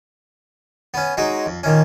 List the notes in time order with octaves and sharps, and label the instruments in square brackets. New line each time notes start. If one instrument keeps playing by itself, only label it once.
[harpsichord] B3 C#4
F#3 G#3 D#4
F2
A#2 D#3 C#4